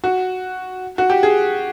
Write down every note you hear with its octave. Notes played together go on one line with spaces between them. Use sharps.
F#4
F#4
G4
G#4